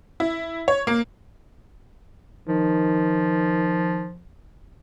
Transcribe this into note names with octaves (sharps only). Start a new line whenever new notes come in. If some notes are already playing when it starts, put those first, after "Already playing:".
E4
C#5
A#3
D#3 F3